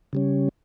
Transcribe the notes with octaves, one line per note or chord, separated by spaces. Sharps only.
C#3 G3 C#4